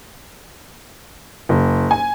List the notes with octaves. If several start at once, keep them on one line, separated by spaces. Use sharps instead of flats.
F#1
G#5